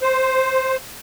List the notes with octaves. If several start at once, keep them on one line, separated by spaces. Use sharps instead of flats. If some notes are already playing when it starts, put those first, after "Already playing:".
C5